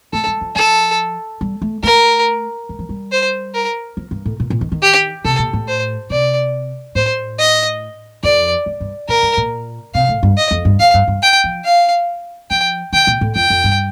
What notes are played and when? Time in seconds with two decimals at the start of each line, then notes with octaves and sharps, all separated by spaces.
0.13 A3 A4
0.27 G3
0.41 F3
0.55 F3 A4
1.41 G3
1.62 A3
1.83 A3 A#4
2.69 G3
2.79 F3
2.89 G3
3.12 C5
3.54 A#4
3.97 F3
4.11 G2
4.25 A2
4.40 A#2
4.50 A#2
4.61 D#3
4.72 D#3
4.82 G4
5.25 C3 A4
5.39 A#2
5.53 A2
5.68 C5
6.10 C3 D5
6.95 A2 C5
7.39 D#5
8.23 F2 D5
8.66 G2
8.80 G2
9.09 A#2 A#4
9.23 G2
9.37 A#2
9.94 C3 F5
10.09 A2
10.23 G2
10.37 D#5
10.51 F2
10.65 G2
10.80 F2 F5
10.94 G2
11.07 G2
11.22 G5
11.44 F3
11.65 F5
12.50 F3 G5
12.93 D#3 G5
13.07 A#2
13.21 A2
13.35 F2 G5
13.50 F2
13.64 G2